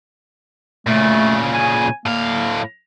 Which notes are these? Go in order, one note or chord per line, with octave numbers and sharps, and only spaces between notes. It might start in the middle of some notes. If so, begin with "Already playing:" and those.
A#2 C#3 A3
G#5
A2 A#3 F5